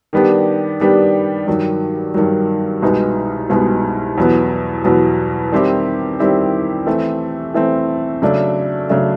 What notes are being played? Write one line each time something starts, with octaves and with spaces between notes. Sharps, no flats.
D#3 G3 B3 D4 G4
D#3 G3 B3 D4 G4
G2 D#3 F#3
G2 D#3 F#3
C2 B2 G#3 B3 D#4
C2 B2 G#3 B3 D#4
E2 B2 F#3 B3
E2 B2 F#3 B3
D#3 G3 C4 E4 G4
D#3 G3 C4 E4 G4
E3 A3 C4
E3 A3 C4
C#3 F#3 A3 D4
C#3 F#3 A3 D4